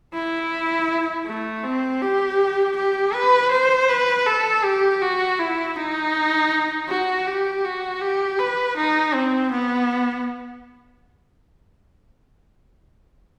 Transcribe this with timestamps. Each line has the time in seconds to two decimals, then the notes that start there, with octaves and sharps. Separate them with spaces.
0.14 E4
1.26 A3
1.64 C4
2.02 G4
2.76 G4
3.14 B4
3.51 C5
3.89 B4
4.26 A4
4.64 G4
5.02 F#4
5.39 E4
5.76 D#4
6.88 F#4
7.27 G4
7.64 F#4
8.01 G4
8.39 B4
8.77 D#4
9.14 C4
9.51 B3